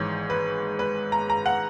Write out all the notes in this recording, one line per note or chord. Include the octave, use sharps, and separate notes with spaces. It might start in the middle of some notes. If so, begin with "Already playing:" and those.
Already playing: G#1 G#2 E3 C#5
B4
B4
A#5
A#5
F#5